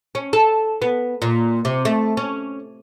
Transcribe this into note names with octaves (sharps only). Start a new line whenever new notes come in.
C#4
A4
B3
A#2
C3
A3
C#4